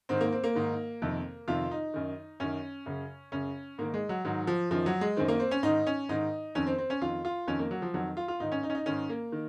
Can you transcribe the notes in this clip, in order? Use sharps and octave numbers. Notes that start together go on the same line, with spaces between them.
G#2 D#3 C4
A#3
C4
A#3
G#2 D#3
F2 C3 D#3
F2 C3 D#3 F4
D#4
F#2 D#3
F#2 D#3 C#4
F#2 C#3
F#2 C#3 C#4
G#2 D#3 A#3
G#3
F#3
G#2 D#3 F#3
F3
F#2 D#3 F3
F#3
G#3
F#2 D#3 C4
A#3
C4
C#4
G#2 D#3 D#4
C#4
G#2 D#3 D#4
F2 D#3 C#4
C4
C4
C#4
F2 D#3 F4
F4
F2 D#3 C#4
A#3
F#3
F3
F2 D#3 F#3
F4
F4
G#2 D#3 D#4
C#4
D#4
C#4
D#4
G#2 D#3 C#4
A#3
D#3